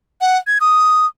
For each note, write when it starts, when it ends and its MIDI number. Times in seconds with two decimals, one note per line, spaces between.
0.21 0.37 78
0.47 0.58 92
0.61 1.06 87